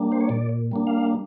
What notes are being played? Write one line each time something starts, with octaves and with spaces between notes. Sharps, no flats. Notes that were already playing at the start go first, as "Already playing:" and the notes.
Already playing: G3 A#3 D4
C5
C#5
A#2 D5
G3 A#3 D4
F5